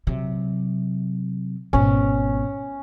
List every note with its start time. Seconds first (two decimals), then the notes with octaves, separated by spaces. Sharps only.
0.07 C3 F#3
1.73 G#1 B2 C#4